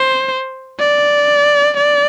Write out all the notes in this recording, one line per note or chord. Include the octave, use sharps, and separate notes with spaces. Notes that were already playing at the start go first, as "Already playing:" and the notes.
Already playing: C5
D5
D5